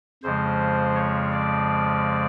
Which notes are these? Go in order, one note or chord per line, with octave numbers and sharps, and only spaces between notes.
F2 C#3 F3 G#3 C5
C#5
D5